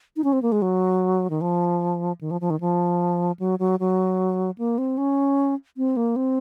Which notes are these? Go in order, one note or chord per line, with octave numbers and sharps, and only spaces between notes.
D#4
C#4
C4
A#3
G#3
F#3
D#3
F3
D#3
F3
F3
D#3
F3
F#3
F#3
F#3
A#3
C4
C#4
C4
A#3
C4